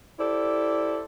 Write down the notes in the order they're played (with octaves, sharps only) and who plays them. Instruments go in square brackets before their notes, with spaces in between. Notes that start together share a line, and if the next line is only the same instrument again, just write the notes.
[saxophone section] E4 G4 A4 C5 D5